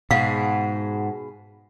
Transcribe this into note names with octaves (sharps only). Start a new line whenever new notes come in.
G#2 B2 G#4 F5 F#5